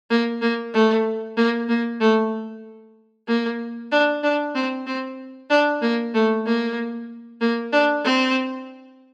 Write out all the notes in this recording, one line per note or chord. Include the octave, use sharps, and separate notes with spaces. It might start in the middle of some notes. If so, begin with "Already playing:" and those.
A#3
A#3
A3
A#3
A#3
A3
A#3
D4
D4
C4
C4
D4
A#3
A3
A#3
A#3
D4
C4